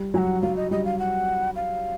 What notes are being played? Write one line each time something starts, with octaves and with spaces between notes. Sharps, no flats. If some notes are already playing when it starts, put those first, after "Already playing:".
Already playing: G3
F#3 F#5 G#5
F#3 F5
D#5
G3 D#5
F5
F#5
F5